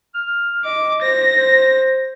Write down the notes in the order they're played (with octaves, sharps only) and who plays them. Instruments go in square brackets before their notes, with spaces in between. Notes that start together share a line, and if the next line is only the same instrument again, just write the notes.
[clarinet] F6
[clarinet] D#5 [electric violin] D6
[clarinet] C5 [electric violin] A#6
[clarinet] C5